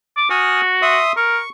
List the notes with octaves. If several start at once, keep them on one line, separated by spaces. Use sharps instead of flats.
D6
F#4 G#5 D#6 F6
E5 C6 D#6
A#4 C#6